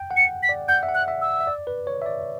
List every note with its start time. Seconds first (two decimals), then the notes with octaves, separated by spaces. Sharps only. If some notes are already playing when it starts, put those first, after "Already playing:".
Already playing: G5
0.11 F#5
0.17 C#7
0.43 B6
0.49 D5
0.68 F#5 G6
0.83 E5
0.89 F#5
0.94 F#6
1.08 E5
1.21 E6
1.40 E5
1.47 D5
1.67 B4
1.87 C#5
2.02 E5
2.06 D5